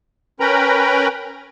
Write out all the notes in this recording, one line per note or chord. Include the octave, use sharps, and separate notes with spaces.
C#4 A#4 B4 G5 A#5 B5